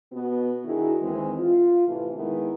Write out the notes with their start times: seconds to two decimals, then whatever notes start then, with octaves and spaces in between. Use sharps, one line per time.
0.13 B2 B3 F#4
0.65 D#3 D4 E4 F#4 G#4
1.02 D#2 D#3 E3 G#3 C4
1.38 F4
1.87 A2 C3 E3
2.16 D#3 G#3 B3 E4